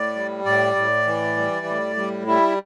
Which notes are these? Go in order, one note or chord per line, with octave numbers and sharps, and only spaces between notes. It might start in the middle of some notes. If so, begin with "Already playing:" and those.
Already playing: A2 D5
G3
A2 D5
A2
E3
G3
A2
G3
G3 E4